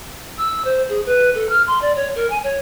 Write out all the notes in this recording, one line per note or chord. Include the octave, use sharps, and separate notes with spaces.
E6
C5
G#4
B4
A4
F6
C6
D5
C#5
A#4
G#5
C#5